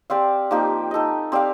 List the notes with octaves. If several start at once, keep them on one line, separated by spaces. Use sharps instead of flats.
C4 G4 D5 F5
F3 A#3 D#4 G4
D#4 A4 D#5
C4 G4 D5 F5